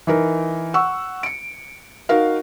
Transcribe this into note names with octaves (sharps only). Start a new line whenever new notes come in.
E3 D#4 A#4
F#5 C#6 E6
C#7 D7
D#4 F#4 A#4 F5